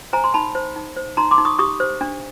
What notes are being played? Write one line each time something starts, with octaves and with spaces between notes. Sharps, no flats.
C5 G#5 A#5
C6
D#4 A5 B5
C5
D#4
C5
D#4 A#5 C6
C6 D6
D#4
C#6 D#6
G4 C#6 D#6
C5
D4